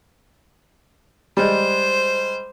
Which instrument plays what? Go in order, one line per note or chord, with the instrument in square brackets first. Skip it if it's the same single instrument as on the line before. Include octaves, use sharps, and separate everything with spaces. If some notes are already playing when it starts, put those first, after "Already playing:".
[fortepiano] G3 G#3 [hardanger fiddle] C5